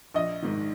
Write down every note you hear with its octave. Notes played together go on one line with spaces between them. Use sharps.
A#1 D#5
G#2 D#3